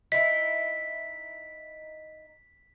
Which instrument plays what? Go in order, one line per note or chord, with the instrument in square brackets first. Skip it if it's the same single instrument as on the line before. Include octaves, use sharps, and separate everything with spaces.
[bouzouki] D#4 E4 [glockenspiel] B6